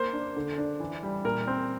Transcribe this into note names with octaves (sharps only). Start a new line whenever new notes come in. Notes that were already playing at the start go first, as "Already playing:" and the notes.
Already playing: A#3 C5
D4
D3
D4
E3
G3
A#2 A#4
C4